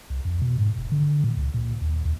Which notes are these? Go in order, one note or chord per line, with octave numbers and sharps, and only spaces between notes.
C2
F2
B2
G#2
E1
D3
A#2
C#2
A#2
D#2
D#2